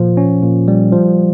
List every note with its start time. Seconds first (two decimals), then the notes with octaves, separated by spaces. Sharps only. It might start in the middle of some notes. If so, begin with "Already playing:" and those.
Already playing: A#2 F3
0.17 C#4
0.43 A#2
0.68 G3
0.92 F3